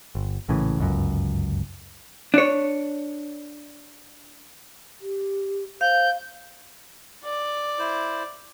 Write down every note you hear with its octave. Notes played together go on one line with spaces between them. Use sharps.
G1
A#1 A2 C#3 E3
G1 C#2 F#2
D4 C#5
G4
C5 F5 G6
D5
E4 C5